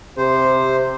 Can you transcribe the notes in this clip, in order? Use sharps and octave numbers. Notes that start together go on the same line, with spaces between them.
C3 C5